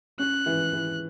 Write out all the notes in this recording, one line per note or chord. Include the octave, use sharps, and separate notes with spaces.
C#4 F#6
E3
E3